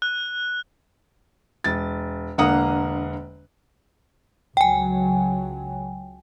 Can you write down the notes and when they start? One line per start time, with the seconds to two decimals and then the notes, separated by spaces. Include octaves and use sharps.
0.02 F#6
1.64 E1 A6
2.38 E1 D3 A#3 F#5 A#5 D#6
4.57 C#2 F#3 G5 G#5